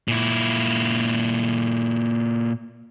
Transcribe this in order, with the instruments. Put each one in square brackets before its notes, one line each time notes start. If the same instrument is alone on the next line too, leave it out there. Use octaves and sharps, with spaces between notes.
[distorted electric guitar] A#2 E4